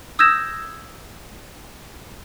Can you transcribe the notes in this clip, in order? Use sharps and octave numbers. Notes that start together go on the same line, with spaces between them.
D#6 E6 G6 G#6 A#6 E7